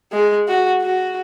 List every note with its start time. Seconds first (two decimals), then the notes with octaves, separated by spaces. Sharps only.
0.12 G#3
0.48 F#4
0.82 F#4